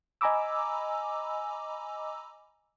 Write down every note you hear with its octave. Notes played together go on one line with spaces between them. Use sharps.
D#5 G#5 A#5 B5 D6 E6